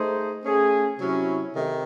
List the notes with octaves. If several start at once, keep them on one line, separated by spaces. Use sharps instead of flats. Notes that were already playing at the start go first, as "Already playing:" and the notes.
Already playing: A3 D#4 G#4 C5
A3 C#4 G#4
C3 F#3 C#4 E4
C3 D#3 A3